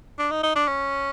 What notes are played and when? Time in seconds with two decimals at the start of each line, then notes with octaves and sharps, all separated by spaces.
0.19 D4
0.31 D#4
0.43 D#4
0.56 D4
0.68 C#4